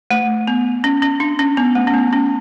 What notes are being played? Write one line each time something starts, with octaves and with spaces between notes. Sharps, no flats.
A3
B3
C#4
C#4
D4
C#4
B3
A3
C#4
B3
C#4